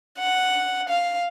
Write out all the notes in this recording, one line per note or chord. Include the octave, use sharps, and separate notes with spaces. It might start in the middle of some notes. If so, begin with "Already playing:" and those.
F#5
F5